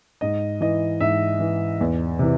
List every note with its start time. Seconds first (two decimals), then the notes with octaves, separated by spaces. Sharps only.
0.21 G#2 D#5
0.61 E3 D#5
1.00 G#2 E5
1.40 E3
1.81 E2
2.19 C3 E3